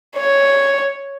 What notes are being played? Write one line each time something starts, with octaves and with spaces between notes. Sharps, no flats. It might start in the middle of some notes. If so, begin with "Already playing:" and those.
C#5